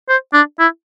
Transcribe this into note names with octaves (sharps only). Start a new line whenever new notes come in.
C5
D4
E4